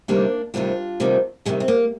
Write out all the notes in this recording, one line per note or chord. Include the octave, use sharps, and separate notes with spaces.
D2 C3 D#3 G3 A#3 D4
D2 C3 D#3 G3 D4 F4
D2 C3 D#3 G3
D2 C3 D#3 G3 G#3
C4
A#3